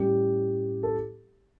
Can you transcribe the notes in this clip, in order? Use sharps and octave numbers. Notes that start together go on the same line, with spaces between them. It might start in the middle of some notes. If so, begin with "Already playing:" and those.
Already playing: A2 G3 C#4 G4
A4